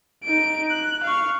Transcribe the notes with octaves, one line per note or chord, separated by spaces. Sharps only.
D#4 D7
F#6
F5 C#6